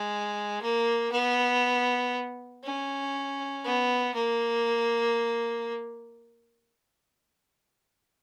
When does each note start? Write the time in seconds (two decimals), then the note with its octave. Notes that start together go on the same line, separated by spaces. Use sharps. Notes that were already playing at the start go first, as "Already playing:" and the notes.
Already playing: G#3
0.62 A#3
1.12 B3
2.64 C#4
3.64 B3
4.14 A#3